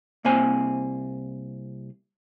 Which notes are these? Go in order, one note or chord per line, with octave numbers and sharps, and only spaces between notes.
C2 A#3 C4 G#5